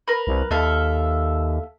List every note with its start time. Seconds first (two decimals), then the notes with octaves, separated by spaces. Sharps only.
0.08 A#4 B4
0.27 C2
0.51 D#2 A4 E5 F5